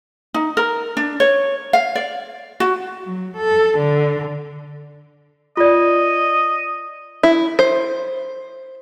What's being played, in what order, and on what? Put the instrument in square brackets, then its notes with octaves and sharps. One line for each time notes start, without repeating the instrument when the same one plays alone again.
[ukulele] D#4
A#4
D4
C#5
F5
D5
F#4
[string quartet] F#3
A4
D3
[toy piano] F4 D5 [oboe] D#5
[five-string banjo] E4
C5